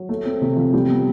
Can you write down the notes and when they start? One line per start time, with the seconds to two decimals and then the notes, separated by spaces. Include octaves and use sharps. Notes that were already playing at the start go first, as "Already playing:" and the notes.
Already playing: F#3
0.09 A3
0.25 C4
0.42 C3
0.57 F3
0.73 G3
0.89 B3